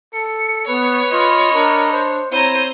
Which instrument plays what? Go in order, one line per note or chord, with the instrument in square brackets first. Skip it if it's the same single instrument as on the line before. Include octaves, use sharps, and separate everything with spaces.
[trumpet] A4 [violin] C#7
[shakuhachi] B3 [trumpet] B4 [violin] C#5
[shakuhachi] F4 [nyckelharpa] D#5 B5
[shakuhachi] D4 [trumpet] A#4
[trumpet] C5
[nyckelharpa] C4 A#5 [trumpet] E4 [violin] C5 D#7 [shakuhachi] C#5